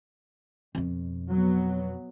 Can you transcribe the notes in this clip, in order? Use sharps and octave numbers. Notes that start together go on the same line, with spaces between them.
F2 B2
F#3 B3